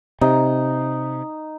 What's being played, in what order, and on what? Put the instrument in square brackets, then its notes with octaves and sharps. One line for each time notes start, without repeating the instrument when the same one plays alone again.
[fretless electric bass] C3 [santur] D#4